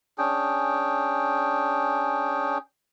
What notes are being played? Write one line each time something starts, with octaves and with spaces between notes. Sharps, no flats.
C#4 D4 G#4 G5